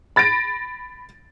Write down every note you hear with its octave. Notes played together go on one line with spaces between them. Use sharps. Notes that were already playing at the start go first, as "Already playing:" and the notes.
B5 A6 A#6 D7